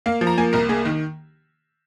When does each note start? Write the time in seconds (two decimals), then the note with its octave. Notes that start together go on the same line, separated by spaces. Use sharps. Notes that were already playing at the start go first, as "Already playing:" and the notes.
0.06 A#3 F5
0.21 F3
0.27 A#5
0.38 A#3 G#5
0.53 C2 A#4
0.69 A#3 G#4
0.85 D#3